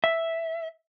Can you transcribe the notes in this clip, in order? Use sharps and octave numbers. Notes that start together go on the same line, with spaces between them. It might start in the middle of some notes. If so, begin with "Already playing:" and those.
E5